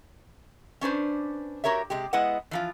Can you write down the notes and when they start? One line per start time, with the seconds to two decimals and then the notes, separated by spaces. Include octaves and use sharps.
0.81 C#4 D4 B4 C5
1.64 F#4 G4 A#4 C#5 E5
1.90 C3 G#3 G4
2.13 G#3 B3 E4 B4 D#5 F#5
2.51 E3 F3 F4